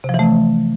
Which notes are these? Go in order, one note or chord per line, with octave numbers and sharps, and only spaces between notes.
C3
F3
E3
A3